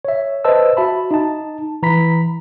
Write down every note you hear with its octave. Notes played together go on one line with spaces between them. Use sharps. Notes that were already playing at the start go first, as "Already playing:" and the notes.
C#5 E5
B4 C5 D#5 A5 E6
F#4 E5 A5 B5
D#4 A5
E3 A#5 B5 B6